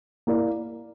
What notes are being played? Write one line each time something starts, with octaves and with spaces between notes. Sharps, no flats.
A#3 E4 A#4 D5